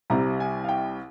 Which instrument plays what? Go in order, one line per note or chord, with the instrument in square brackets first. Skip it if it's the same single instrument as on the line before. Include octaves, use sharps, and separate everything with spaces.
[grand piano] C2 C3 G3 C4 A#5
G#5
F5
G5